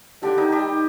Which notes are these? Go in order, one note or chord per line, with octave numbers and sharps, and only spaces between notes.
D3 D4 G4
D#3 D#4
G3 G4